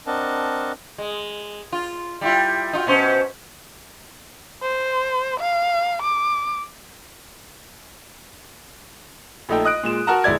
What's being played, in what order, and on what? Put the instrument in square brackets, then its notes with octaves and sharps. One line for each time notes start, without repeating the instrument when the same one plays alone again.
[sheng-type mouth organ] C4 D4 A#4 D#5 F#5 A5
[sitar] G#3
F4
G3 E4 F4
D#4 F4 F#4
B2 C#4 C5
[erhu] C5
F5
D6
[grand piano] A#1 A3 D#4 A4 G5
D#5 D#6 F#6 D7
A#2 G#3 E7
F#4 A#4 F#5 A5 A#5
G1 G#3 E4 D5 G#6